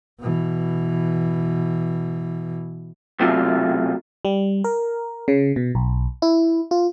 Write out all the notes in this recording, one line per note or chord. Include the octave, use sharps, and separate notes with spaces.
B2 E3
B1 E2 C3 F#3 A3 F4
G3
A#4
C#3
B2
B1
E4
F4